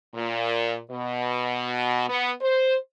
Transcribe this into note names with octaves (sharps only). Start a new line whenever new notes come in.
A#2
B2
B3
C5